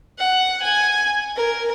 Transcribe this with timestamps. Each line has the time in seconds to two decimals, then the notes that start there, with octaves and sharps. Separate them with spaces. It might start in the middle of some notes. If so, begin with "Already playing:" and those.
0.19 F#5
0.62 G#5
1.36 A#4